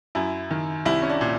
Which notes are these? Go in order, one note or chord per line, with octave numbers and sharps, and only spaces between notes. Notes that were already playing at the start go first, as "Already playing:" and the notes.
F#2 E4
D#3
C2 E4
C#4
D4
A#2